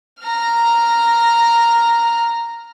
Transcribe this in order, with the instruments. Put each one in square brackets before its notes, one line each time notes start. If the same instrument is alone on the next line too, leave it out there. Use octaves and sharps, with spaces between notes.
[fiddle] A#5 F6